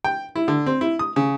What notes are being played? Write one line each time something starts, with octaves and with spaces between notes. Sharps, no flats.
G5
E4
D3
C4
E4
D#6
C#3